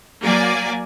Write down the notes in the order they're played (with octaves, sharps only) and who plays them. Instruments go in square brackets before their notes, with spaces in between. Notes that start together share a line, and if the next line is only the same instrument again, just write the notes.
[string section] F#3 A#3 D5 G#5